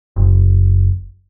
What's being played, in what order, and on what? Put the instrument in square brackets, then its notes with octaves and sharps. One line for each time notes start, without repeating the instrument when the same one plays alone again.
[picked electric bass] F#1